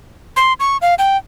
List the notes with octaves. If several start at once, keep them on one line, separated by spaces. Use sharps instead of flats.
C6
C#6
F5
G5